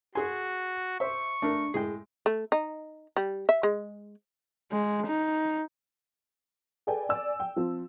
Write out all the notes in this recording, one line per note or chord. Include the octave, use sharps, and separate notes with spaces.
F#4 G#4 G#5 C6
C5 E5 C#6
A3 D4 A#4
A2 G#3 G#4 G5
A3
D#4
G3
E5
G#3
G#3
D#4
G#4 A4 B4 D5 G5 G#5
D5 G#5 E6
G5
F3 C4